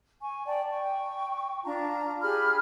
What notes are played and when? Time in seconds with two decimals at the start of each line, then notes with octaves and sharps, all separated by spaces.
0.22 G#5 C#6
0.46 D5 G5 A5
0.71 G5 C#6
1.64 D4 F4 A5 A#5
2.22 G4 G#4 B5 F6